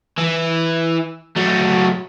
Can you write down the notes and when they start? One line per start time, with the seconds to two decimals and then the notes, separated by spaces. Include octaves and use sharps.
0.18 E3
1.37 F#3 A3